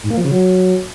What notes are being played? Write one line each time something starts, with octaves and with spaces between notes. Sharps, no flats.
G#2
A#3
F3
C#3
F#3